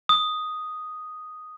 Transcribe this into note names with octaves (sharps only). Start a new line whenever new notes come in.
D#6